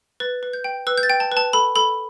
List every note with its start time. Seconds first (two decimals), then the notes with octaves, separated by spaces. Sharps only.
0.20 B4 A6
0.43 B4
0.53 G6
0.64 G5
0.87 B4 E6
0.98 G6
1.03 A6
1.09 G5
1.20 A5
1.32 B4
1.37 A5
1.53 A4 B5
1.76 A4 B5